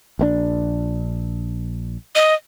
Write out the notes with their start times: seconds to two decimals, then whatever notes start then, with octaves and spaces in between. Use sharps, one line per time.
0.19 A#1 D#3 D4
2.15 D#5